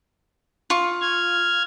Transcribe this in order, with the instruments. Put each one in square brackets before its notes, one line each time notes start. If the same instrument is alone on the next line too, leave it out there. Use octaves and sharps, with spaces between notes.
[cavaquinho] F4 C#6
[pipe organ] F6 G#6